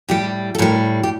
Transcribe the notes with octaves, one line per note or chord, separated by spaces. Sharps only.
A2 G3 G4
A4
A2 G3 A#4
G4